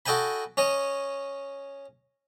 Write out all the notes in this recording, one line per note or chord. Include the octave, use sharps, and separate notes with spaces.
F#4 A4 D#5 G5 G#5 B5
C#4 C#5 D#5